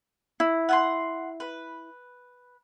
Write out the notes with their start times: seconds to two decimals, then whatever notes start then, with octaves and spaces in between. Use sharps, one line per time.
0.40 E4
0.69 F#5 G#5 C6
1.40 B4